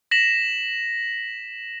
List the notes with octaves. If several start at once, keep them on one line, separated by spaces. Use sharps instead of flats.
A#6 B6 E7 F#7